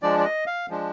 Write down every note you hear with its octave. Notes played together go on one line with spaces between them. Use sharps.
F3 G#3 D4 D5
D5
D#5
F5
F3 G#3 D4